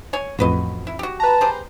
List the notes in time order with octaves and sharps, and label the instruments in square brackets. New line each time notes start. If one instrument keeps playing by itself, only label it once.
[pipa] C#5 G#5
[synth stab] A1 F2 [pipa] F#4 B4 D#5
[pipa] E4
F#4 G4
[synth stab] B4 A#5 [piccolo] A5
[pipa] G4 G#4 C5